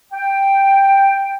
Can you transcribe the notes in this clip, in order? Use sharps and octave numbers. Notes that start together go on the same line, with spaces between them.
G5